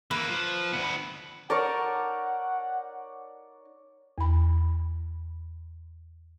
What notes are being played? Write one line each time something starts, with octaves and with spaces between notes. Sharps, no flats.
E3 A#3 B4
F3
D2 B3
D#4 A#4 C#5 D5 F#5 A5
E2 B5